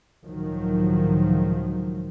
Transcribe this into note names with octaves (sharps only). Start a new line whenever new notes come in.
C#2 A2 D#3 F3 F#3